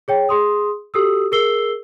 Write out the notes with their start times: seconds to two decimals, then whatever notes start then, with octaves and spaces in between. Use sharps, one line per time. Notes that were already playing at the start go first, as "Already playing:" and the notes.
0.08 G#4 C#5 G5
0.29 G#4 C6 D#6
0.94 F#4 G4 A4 D#6 E6
1.32 G#4 A#4 E6 C7 G7